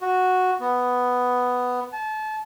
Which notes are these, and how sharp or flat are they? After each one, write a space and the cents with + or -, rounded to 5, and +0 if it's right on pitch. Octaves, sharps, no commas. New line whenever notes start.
F#4 -5
B3 +5
A5 -30